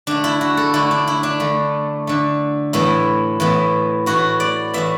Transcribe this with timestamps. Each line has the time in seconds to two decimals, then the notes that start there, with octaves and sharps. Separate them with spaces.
0.07 D3 A3 D4
0.24 E4
0.41 F#4
0.57 A4
0.74 D3 A3 E4
0.91 D4
1.08 E4
1.23 D4
1.40 D3 A3
2.07 D3 A3
2.73 A2 E3 B3 E4
3.40 A2 E3 B3
4.06 A2 E3 B3 F#4
4.40 D5
4.74 A2 E3 B3 E5